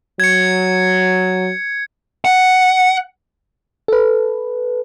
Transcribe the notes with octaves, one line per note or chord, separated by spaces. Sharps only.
F#3 G#6 C#7
F#5
A4 B4